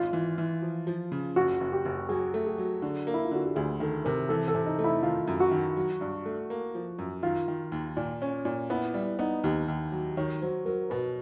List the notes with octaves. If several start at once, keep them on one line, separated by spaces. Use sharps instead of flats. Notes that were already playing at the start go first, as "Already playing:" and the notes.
Already playing: G#1 F4
E3
E3
F3
F3
C#3
F#1 F#4
F#1
G4
F#1
F#3 G#4
A3
G#4
F#3
D3
A#3
E4
F4
D3 F#4
G4
D2 G#4
D#3 A4
C3 A#4
E3 A4
A4
C3
D#4
A3
E4
D#3 F4
F#2
F#4
D#3
F#3
G2
A3
A#3
F3
F#2
D#3 F4
D#3
D#2
A#2
C#4
A#2
B3 E4
G3 E4
B3 D#4
D#2 G4
D#2
F#3
D#3 C#5
F#3 C5
F#3 A#4
B2 B4